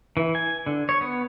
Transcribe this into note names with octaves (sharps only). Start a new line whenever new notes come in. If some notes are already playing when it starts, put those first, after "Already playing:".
E3
G#5
D3
C#5
B3